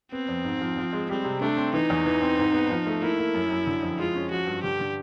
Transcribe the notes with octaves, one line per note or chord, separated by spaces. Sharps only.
B3 C4
F2
G#2
F3
F3
G#3
G3 C4
C3
A3 D4
C4
E3 D#4
E2
E3
C4
G#2
B3
F3
A3
A#3 E4
A#3
F#2
F#2
D3
F2
G#3 F4
C#4
F3 F#4
G2
D3 G4
D3